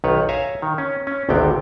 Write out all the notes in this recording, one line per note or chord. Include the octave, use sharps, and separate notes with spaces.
B1 D#3 B4 C#5
C#5 E5 F5 G#5 A#5
D#3
C#4
C#4
G#1 D2 C3 B3 G5